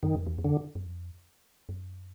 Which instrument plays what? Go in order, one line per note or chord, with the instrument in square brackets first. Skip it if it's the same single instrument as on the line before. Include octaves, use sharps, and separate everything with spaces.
[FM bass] F#2 [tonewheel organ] D#3
[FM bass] F2
E2
F2
[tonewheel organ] D3
[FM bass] F#2
F2
F#2